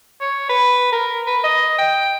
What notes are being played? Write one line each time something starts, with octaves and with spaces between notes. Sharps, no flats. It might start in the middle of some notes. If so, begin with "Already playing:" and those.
C#5
B4
A#4
B4
D#5
G5